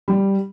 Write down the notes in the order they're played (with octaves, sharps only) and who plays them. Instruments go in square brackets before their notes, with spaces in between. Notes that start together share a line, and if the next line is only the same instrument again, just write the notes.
[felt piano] G3